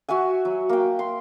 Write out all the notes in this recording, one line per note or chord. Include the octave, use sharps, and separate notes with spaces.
F#4 E5 F#5 G#5
F#3
A#3 G5
C6